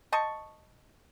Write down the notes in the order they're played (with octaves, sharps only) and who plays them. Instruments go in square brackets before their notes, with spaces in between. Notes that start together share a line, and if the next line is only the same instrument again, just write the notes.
[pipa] C5 D#5 A5 C#6